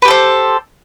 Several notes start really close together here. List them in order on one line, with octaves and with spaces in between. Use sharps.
B4 G4 A4 C5